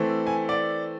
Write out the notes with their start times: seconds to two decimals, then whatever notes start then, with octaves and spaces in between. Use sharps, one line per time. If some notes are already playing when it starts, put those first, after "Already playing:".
Already playing: E3 A3 C4
0.27 G#5
0.49 D5